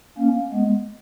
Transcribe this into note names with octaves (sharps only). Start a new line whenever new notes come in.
A#3 C#4
G#3 B3